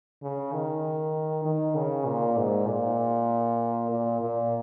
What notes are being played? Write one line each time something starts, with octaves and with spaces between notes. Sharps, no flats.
C#3
D#3
D#3
C#3
A#2
G#2
A#2
A#2
A#2